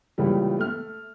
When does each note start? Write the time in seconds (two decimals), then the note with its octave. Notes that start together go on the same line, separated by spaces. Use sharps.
0.18 C#2 A#2 C#3 E3 G3
0.58 A3 F6